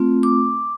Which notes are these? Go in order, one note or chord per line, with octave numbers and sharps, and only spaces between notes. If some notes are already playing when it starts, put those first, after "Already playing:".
Already playing: A3 C4 F4
D6